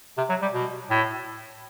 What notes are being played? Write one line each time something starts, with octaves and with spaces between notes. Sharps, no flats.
C3
F#3
G3
B2
A2